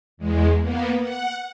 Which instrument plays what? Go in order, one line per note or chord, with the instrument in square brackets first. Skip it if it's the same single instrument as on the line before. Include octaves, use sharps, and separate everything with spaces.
[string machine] E2 G#3
A#3 B3
F#5